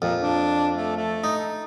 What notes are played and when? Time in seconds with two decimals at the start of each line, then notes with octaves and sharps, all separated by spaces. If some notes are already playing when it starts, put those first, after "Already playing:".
0.02 F2 A#2
0.19 D4
0.75 A3
0.96 A3
1.24 D#4